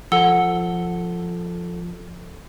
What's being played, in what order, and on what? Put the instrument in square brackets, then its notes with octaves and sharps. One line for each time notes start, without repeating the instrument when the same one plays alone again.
[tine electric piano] F3 A4 [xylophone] F#5 E6 G7